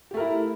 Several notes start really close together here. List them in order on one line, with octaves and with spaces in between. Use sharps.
G4 A3 A#4 E4